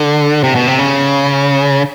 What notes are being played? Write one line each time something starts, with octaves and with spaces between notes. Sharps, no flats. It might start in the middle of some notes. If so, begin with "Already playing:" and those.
Already playing: D3
C3
B2
C3
C#3